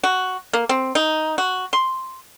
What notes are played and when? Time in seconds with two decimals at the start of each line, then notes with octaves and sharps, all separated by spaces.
0.04 F#4
0.53 A#3
0.69 C4
0.95 D#4
1.38 F#4
1.73 C6